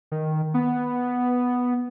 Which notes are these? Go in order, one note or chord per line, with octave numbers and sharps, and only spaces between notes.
D#3
B3